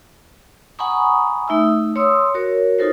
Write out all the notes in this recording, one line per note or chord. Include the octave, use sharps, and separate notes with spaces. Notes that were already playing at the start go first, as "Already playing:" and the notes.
F#5 G#5 A#5 B5 C#6 D#6
A3 D#4 E5 D#6 E6
C#5 C6 D#6 E6
F#4 A#4 C#5
D#4 F4 A4 A#4 C5